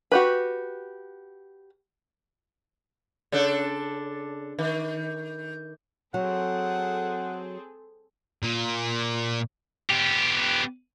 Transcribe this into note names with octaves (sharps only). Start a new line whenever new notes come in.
F#4 G4 B4
C#3 D4 A4
D#3
F#3 C4 G#4 A4 F#5
A#2
B3 G4